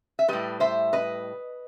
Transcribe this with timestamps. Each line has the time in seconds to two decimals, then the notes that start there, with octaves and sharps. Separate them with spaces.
0.19 E5
0.28 A2 G3 B4 D#5
0.60 C5 E5
0.93 B4 D#5